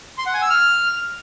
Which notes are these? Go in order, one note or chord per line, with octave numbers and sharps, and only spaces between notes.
C6
F#5
G#5
E6
F6